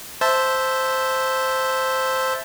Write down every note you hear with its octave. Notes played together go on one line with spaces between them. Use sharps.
C5 E5 A5